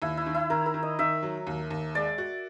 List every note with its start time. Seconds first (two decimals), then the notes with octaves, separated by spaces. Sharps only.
0.02 D#2 E4
0.17 E4
0.26 D#3
0.34 E4
0.50 D#3 A#4
0.66 A#4
0.74 D#3
0.83 D#5
0.99 D#3 E5
1.23 F#3
1.47 D#2
1.71 D#2
1.95 G#3 D5
2.18 F#4